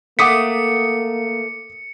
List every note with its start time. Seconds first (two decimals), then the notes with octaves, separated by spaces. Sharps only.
0.19 A3 A#3 F#5 D6 D#6 B6 C#7